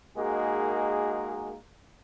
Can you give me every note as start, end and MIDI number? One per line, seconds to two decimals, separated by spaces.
0.17 1.55 56
0.17 1.55 58
0.17 1.55 63
0.17 1.55 66
0.17 1.55 68
0.17 1.55 70